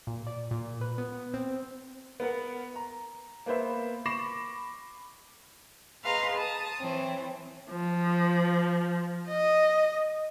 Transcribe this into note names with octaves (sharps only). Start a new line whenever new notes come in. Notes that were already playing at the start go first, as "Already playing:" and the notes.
A#2
D5
A#2
B4
B3
C4
B3 A#4 F#5
A#5
A#3 B3 B4 C5 E5
B5 C#6 D6 A#6 C7 E7
G#4 B4 D#5 F5 A#5 C6
A5 D#6
E3 C4 C#5
F3
D#5